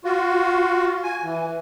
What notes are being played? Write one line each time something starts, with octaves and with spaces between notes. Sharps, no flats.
F4 F#4
G#5
E3